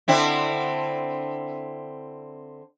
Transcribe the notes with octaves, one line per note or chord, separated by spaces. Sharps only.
D3 C4 E4